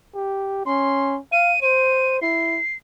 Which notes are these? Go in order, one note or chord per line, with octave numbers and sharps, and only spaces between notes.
G4
C#4 C6
F5 D#7
C5 D#7
E4 C7